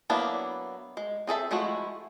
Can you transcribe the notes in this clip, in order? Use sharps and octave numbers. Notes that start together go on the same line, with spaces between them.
F#3 A#3 B3 D4 E4
G#3
C4 G#4 A4 E5
F3 G#3 A3 E4 F#4